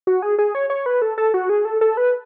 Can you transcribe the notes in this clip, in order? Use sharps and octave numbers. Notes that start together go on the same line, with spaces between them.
F#4
G#4
G#4
C#5
C#5
B4
A4
A4
F#4
G#4
A4
A4
B4